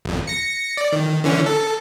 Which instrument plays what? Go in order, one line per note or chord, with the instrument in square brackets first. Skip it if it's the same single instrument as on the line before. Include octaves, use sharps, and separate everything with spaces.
[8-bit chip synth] G#1 F2
A#6 C#7
D5
D#3
D3 E3 C#4
A4